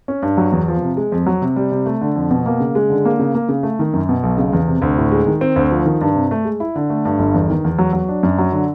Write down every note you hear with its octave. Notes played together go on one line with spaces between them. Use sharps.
C#4
G2
F#3
E2
F3
C3
G#3
F2
F#3
C3
G3
C3
A3
D3
F2
B2
A#3
C#3
G#3
D3
A#3
C#3
A#3
C#3
A3
D#3
F#2
B2
B1
C#3
E2
C3
D2
A2
G#3
D#3
C4
D2
F3
D#3
G2
C3
A3
G#3
E4
D3
A3
G2
G1
E2
D#3
E2
F#3
F#3
D4
F#2
F#3
D3